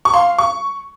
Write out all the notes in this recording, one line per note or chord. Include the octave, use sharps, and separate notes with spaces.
C#6
F5 C6
C#6